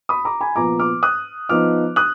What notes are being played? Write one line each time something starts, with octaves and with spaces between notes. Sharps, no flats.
B5 D#6
A#5 D6
G#5 B5
A#2 F3 B3 A#5 D6
D6 F6
D#6 F#6
F3 B3 D#4 D6 F6
D#6 F#6